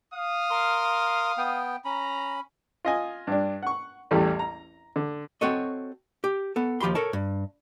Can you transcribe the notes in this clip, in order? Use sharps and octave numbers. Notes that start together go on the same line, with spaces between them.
F5 D#6
A#4 C6
B3 G5
C#4 A#5 B5
F4 D#5 G#5
G2 D4
F#5 C#6
A1 E2 G3 A3
A#5
D3
C4 F#4 A4 C#5 D#5
G4
B3 A4
D#2 F3 G4 B5 C6
A4 A#4 C#5 A5
G2